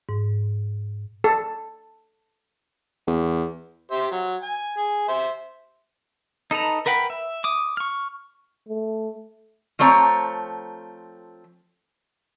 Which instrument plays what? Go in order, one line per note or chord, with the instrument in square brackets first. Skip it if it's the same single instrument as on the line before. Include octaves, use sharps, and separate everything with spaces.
[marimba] G#2
[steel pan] A4
[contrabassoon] E2
[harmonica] G4 C5 E5
F#3
G#5
G#4
C5 E5
[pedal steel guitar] D#4 A4 B4 A#5
A#4 B4 F#5 G5 B5
E5
D6 D#6
C#6 F6
[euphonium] A3
[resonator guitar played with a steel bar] F3 A3 C4 C#5 A#5